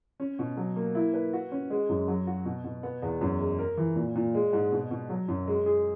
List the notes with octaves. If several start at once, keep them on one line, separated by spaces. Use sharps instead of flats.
C#4
B2
F#3
A#3
E4
B4
F#4
C#4
G#3
F#2
F#3
F#4
B2
B2
B3
E2
F#2
G#3
A#4
E3
A#2
A#2
G#3
G#2
B2
B2
F#3
F#2
G#3
G#4